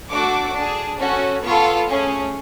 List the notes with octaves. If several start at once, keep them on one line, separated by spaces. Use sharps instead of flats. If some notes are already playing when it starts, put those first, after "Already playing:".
A3 D4 F#4 A4 D6
D4 G#4
C#4 F#4 A4
B3 F4 A4 C#6
A3 C#4 G#4